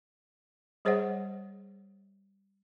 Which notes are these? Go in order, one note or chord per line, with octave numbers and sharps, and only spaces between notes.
G3 G#4 C5 C#5 D#5 F#5